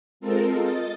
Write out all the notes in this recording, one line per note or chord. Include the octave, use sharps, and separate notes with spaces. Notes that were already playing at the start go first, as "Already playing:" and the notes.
G#3 C4 F4 A4 A#4
D#5 A6